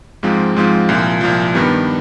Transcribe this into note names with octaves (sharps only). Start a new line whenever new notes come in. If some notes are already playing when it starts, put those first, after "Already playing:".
G#2 F3 G#3 C4 F4
G#2 F3 G#3 C4 F4
C2 A#2 F3
C2 A#2 F3
G2 D#3 G3 B3